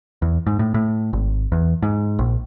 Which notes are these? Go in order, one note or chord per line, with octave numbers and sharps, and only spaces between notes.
E2
G#2
A2
A2
G#1
E2
G#2
A#1